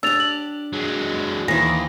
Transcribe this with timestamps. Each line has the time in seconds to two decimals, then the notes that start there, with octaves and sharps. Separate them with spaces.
0.03 D4 G4 E6 A6 F7
0.20 F#7
0.73 F#3 G#3
1.48 D#2 E3 C5 A#6